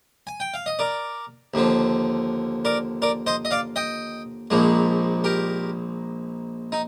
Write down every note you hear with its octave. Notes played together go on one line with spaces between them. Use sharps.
G#5
G5
F5
D#5
A#4 D5
D#2 D3 F3
A#4 D5
A#4 D5
C5 D#5
D#5
D5 F5
D#5 G5
A#1 A#2 F3 G#3
G4 A#4
D#4